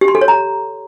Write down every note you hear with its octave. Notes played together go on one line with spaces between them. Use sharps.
G4
C6
A4
C#5
A#5